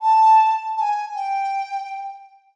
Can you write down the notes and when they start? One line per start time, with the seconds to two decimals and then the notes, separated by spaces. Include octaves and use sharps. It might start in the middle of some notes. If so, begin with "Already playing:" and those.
0.01 A5
0.77 A5
0.80 G#5
1.15 G5